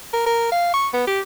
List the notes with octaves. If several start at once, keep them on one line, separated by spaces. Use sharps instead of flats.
A#4
A#4
F5
C#6
B3
G4